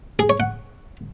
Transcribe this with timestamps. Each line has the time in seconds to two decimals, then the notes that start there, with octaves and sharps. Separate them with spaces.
0.19 G#4
0.30 C#5
0.40 F#5